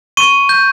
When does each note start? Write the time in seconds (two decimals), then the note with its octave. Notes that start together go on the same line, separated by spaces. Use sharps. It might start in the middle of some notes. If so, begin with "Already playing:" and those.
0.17 C#6 D#7
0.49 G6